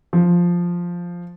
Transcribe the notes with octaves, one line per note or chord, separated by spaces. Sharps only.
F3